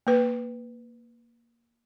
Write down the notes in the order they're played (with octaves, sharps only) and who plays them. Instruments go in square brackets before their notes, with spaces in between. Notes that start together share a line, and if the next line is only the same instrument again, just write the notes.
[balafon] A#3 B4